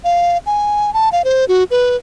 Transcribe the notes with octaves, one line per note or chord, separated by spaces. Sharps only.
F5
G#5
A5
F5
C5
F#4
B4